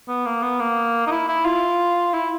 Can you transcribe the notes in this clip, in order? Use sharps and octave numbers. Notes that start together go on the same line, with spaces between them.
B3
A#3
B3
A#3
D#4
E4
E4
F4
E4